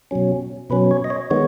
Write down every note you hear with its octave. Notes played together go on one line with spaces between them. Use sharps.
B2 F#3 C#4
B2 F#3 C#4 B4
C#5
D#5
C#5
D#3 G#3 B3 C#5